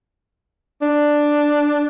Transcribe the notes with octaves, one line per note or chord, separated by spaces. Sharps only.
D4